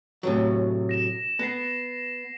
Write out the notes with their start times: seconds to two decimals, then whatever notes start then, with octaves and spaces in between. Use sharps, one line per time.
0.23 A2 C3 F#3
0.89 A#6 E7
1.39 B3 A#6 C7